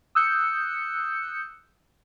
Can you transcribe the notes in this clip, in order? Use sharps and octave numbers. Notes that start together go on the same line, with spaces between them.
D#6 E6 F#6 G6 C#7